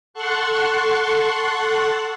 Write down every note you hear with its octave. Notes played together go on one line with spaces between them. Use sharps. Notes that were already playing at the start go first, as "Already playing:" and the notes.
A4 F#5 A5 C6 C#6 F#6